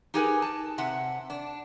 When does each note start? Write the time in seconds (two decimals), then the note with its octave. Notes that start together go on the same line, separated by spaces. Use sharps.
0.14 D#4 G4 G#4 A#4 B4 G#5
0.42 A5
0.78 C3 E5 F#5
1.30 D4